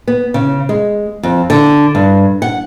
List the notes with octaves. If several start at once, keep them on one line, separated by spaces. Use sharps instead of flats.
B3
C#3
G#3
F2
D3
G2
F#5